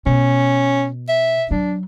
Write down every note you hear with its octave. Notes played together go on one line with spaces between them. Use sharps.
B2 C#4
E5
F#3 D4